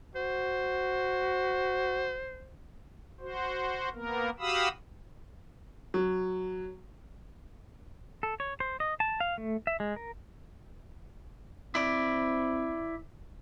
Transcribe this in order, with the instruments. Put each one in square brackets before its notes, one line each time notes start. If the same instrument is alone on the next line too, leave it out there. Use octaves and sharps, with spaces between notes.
[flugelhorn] F#4 [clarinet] C5
[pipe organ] F#4 C5
A#3 B3 A#4
F#4 G4 F5 B5 D#6 E6
[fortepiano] F#3
[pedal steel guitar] A4
C#5
C5
D#5
A5
F5
A3
E5
G#3
A#4
[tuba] C4 [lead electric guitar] E4 D5